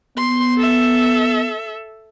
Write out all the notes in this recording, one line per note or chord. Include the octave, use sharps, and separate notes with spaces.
B3 C6
A4 E5